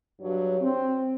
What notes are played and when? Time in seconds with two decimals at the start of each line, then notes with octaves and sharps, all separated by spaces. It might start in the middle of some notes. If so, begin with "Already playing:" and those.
0.21 G2 F#3 C#5
0.60 C4